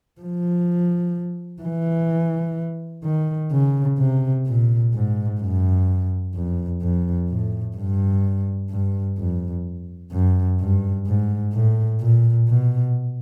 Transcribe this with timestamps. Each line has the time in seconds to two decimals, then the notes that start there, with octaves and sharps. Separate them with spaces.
0.21 F3
1.62 E3
3.04 D#3
3.52 C#3
3.98 C3
4.46 A#2
4.94 G#2
5.40 F#2
6.35 F2
6.81 F2
7.29 A2
7.76 G2
8.70 G2
9.18 F2
10.12 F#2
10.60 G2
11.06 G#2
11.53 A2
12.00 A#2
12.48 B2